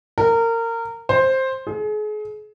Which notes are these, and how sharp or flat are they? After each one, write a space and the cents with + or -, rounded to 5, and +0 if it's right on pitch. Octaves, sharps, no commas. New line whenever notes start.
A#4 -25
C5 +10
G#4 +35